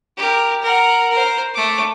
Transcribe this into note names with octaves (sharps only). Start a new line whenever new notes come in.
G4 A#4
A#4 F#5
A#4 C5
A3 D6